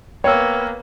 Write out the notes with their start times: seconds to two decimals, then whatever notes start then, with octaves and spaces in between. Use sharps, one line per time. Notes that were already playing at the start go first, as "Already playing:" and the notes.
0.24 A#3 B3 C#5 G5 E6